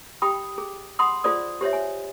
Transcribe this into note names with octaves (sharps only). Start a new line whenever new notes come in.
G4 G5 B5 D#6
G#4
F#5 B5 C6 D#6
F4 G#4 C5 D5 D#6
G4 C5 C#5 E5
G#5